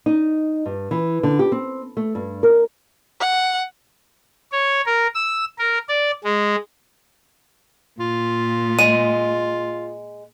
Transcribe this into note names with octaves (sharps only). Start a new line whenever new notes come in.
D#4
G2
E3
D3
G4
C4
A3
G2
A#4
F#5
C#5
A#4
E6
A#4
D5
G#3
A#2 F4
G#3 D#7